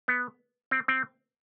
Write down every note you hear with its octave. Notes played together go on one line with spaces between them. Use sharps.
B3
C4
C4